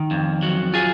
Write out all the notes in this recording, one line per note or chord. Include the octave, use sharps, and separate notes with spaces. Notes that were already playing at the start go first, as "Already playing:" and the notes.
Already playing: D#3
F2
F#3
F4 G#4